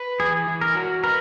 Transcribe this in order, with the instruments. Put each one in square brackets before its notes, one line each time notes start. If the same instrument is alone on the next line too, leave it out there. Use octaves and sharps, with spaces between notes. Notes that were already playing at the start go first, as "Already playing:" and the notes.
Already playing: [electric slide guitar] B4
[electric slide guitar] E3 [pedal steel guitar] G#4
[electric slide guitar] E3
[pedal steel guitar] A#4
[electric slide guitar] F#4
[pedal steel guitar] A#4 [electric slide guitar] B4